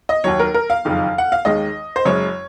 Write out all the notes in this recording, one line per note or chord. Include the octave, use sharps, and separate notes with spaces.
D#5
D#2 D#3 F#3 C#5
A#4
A#4
F5
F#1 F2 D#3
F#5
F5
D#2 D#3 G#3 D#5
C5
F#1 F#2 C#3 G#3 C#5